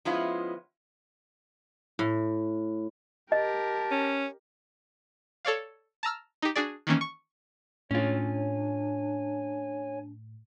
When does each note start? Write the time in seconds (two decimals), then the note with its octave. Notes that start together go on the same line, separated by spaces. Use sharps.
0.05 F3 G#3 B3 C#4 E4 F4
1.99 A2
3.32 G4 A#4 D#5 A5
3.92 C#4
5.45 A4 C#5 D5 F5
6.03 A5 A#5 E6 F6
6.42 D#4 G4
6.56 D4 F#4 G#4 D5
6.87 D#3 E3 A#3 C#4
7.01 C#6
7.91 A2 C#4 D4 F4 C#5 G#5